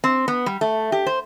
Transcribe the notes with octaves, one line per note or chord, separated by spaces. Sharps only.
C4
B3
G3
A3
G4
C5